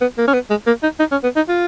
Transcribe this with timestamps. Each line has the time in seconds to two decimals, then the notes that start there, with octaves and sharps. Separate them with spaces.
0.01 B3
0.18 A#3
0.28 C#4
0.34 B3
0.50 G#3
0.67 A#3
0.83 D#4
0.99 D#4
1.11 C#4
1.23 B3
1.36 D#4
1.49 F4